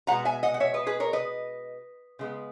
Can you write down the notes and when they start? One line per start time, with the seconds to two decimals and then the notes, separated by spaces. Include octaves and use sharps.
0.07 B2 G#3 B3 F#5 A#5
0.25 E5 G#5
0.43 D#5 F#5
0.54 F#5
0.60 C#5 E5
0.74 B4 D#5
0.87 G#4 B4
1.00 A#4 C#5
1.13 B4 D#5
2.19 C#3 G#3 B3